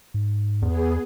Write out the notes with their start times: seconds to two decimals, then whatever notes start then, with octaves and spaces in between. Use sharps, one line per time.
0.14 G#2
0.62 E2 B3 G#4